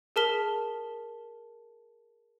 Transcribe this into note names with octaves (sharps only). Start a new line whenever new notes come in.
G#4 A#4 A5 F6 B6 G7